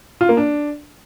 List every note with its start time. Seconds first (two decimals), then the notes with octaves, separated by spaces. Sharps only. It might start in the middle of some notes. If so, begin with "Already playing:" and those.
0.21 F4
0.29 A#3
0.37 D4